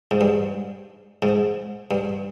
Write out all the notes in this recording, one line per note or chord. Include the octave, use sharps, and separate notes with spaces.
G#2
G2
G#2
G2